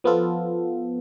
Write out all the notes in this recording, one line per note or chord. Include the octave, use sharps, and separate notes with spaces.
F3 B3 F4 A4